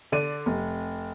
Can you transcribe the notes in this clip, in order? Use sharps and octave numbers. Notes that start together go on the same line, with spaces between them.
D3 D5 D#7
F1